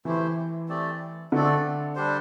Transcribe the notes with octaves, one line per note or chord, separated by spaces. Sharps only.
E3 A3 E4 G4 C5
A3 C4 G4 D5
D3 A3 C4 A4 D5
G3 D4 G4 C5